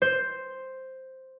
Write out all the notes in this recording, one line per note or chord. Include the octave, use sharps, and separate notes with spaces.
C5